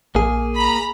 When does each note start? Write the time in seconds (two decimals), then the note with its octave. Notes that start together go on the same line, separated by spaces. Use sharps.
0.15 A#1 A#3 G#4
0.56 A#5 B5